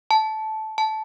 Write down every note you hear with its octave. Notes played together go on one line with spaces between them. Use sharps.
A5
A5